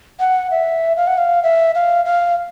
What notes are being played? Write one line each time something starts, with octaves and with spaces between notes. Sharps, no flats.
F#5
E5
F5
F#5
F5
E5
F5
F5